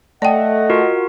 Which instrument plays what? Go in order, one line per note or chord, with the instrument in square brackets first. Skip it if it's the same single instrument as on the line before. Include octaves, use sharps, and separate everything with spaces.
[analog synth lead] A3 [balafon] D5 G5 [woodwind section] D#5 F#5
[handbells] F4 F#4 A#4